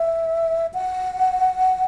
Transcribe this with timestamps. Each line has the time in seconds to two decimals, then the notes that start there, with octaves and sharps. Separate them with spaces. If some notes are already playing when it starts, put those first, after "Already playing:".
Already playing: E5
0.74 F#5